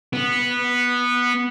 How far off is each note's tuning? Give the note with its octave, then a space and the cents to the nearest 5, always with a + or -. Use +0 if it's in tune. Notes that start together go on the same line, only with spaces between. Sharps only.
B3 -10